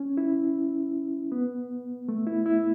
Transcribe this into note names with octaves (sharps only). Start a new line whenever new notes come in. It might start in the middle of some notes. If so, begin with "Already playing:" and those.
Already playing: C#4
E4
B3
A3
E4
E4